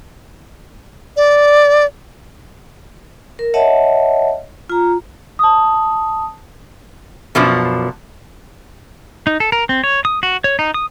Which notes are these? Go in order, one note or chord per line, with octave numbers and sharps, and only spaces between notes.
D5
A#4
C#5 D#5 E5 F#5 A5
F4 A#5
A5 D#6
F#2 B2 F3 D4
D#4
A4
A#4
C4
C#5
D#6
F#4
C#5
D#4
D#6